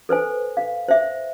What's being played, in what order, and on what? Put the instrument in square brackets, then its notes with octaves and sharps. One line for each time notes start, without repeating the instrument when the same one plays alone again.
[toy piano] A4 B4 C5 G#5
F5
C5 E5